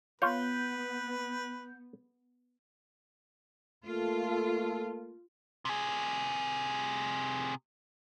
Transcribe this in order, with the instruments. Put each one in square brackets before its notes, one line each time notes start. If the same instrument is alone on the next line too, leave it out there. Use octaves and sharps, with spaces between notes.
[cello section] B3 [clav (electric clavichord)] F4 C#5 [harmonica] B4 [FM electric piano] G6
[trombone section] A3 A#3 A4 [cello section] F4
[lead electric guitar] C3 G#4